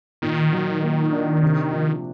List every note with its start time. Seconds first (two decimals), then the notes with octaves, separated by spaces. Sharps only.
0.22 A#2 D#3
0.53 F#3
0.82 A#3
1.12 D4
1.43 C3
1.72 F3